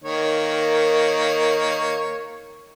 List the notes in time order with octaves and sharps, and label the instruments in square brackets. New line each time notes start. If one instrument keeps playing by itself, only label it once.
[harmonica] D#3 A#3 C#5